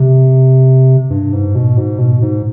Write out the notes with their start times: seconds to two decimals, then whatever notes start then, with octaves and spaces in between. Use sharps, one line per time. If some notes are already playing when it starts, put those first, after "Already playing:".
Already playing: C3
1.10 G2
1.33 G#2
1.55 B2
1.77 G#2
1.99 B2
2.22 G#2